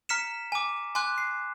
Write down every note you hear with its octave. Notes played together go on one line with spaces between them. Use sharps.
A#5 F6 B6 C#7 E7
G#5 D6
G#5 C6 D6 F#6
C7